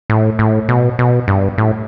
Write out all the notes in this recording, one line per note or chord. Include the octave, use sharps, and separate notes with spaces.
A2
A2
B2
B2
G2
A2